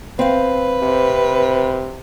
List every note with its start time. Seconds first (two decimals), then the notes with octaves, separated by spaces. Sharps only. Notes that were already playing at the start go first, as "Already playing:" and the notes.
0.19 C4 B4 F5
0.83 C3